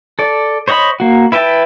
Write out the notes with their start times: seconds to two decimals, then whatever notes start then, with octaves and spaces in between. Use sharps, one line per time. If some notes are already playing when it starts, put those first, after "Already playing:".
0.19 A4 D5
0.68 C5 C#5 D#5 F#5 B5
1.00 A#3 F#4
1.32 E4 B4 E5 G5 A5